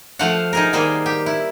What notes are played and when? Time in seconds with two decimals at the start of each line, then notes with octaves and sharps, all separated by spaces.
0.19 F3 A3 C5 F5 F#5
0.53 D#4 G#4 A#4
0.73 D#3 G3 A#3 G#4 C5
1.06 G4
1.26 E4